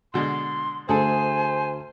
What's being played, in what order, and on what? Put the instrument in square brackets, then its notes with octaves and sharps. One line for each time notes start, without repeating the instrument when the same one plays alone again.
[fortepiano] B2 D3 G#3 [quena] C6
[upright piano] D2 [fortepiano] G#4 A4 [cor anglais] C5 [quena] G#5